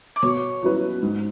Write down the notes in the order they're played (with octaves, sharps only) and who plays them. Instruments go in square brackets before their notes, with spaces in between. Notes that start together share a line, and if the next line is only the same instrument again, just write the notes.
[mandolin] D5
[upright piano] B2 [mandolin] C#5
[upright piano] F#3 C#4 E4 B4
G#2